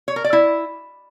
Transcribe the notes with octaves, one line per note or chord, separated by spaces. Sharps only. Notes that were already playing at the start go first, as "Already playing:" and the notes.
C#5
A#4
D5
E4